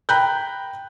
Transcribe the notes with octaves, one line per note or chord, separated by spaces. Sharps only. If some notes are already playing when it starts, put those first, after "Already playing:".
G5 A#5 B5 F#6 G6